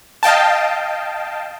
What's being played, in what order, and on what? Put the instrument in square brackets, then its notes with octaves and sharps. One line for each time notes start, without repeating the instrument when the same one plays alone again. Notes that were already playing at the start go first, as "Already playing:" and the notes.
[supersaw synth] D#5 F5 G5 A5